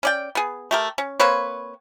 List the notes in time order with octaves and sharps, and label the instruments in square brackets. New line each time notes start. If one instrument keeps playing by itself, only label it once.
[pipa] C#4 D5 G5
B3 G#4
A3 G4 A#4
C#4
A#3 C4 B4 C#5